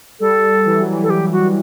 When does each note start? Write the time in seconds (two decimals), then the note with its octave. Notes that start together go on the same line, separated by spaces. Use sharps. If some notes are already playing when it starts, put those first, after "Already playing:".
0.20 G3 A4
0.66 E3
0.78 F#3
0.92 E3
1.03 A4
1.10 G4
1.32 F#4